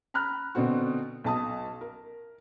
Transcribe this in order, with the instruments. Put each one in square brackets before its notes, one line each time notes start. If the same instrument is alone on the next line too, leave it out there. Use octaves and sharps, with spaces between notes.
[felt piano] A#5 B5 F6 F#6
B2 D3 C4 F#4
B1 A5 D#6
A#4